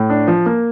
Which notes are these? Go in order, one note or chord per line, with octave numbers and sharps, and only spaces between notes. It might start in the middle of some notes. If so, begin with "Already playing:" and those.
Already playing: A2
D4
F3
A#3